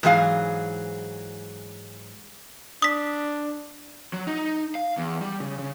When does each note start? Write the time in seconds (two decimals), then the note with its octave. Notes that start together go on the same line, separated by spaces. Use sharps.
0.03 G#2 E3 F#3 G#4 F5
2.82 D4 D#6 B6
4.13 F#3
4.27 D#4
4.75 F5
4.98 E2
5.21 G3
5.40 C#3
5.59 C#3